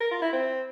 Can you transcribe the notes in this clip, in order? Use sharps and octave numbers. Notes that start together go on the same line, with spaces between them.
A#4
F4
E4
C4